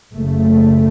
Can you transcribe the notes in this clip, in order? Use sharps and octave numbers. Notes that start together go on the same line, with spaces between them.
F#1 F#2 C#3 A3